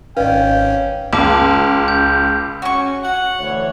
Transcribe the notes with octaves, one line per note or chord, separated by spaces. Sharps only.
G#1 C#4 B4 D5 D#5 F5 G5
C#2 A5 D6
G6
C#4 F#4 C#6
F#5
D2 E3 C#5